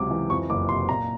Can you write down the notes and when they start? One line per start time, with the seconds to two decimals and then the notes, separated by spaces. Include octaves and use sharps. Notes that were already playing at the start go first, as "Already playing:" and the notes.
Already playing: C#2 C3 F#3 D6
0.11 E3
0.30 F2 C#6
0.50 F#1 D6
0.69 C3 C6
0.88 A#2 A#5